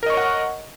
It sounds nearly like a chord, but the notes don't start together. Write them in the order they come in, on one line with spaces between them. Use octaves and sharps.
A#4 D#5 C#6 C#5 F#5